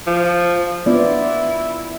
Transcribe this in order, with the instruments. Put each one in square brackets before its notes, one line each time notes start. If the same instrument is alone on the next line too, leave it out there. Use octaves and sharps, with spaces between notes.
[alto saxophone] F3
[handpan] B3 F4 D5 [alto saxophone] E4